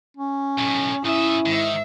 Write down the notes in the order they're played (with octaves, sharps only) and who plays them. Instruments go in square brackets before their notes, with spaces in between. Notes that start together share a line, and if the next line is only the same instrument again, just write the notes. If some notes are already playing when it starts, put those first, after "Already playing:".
[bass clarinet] C#4
[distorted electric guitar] B1 A2
[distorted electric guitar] G#2 E5 [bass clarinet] C#4 [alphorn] E4 [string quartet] D#6
[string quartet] G#2 E5 [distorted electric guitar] D#3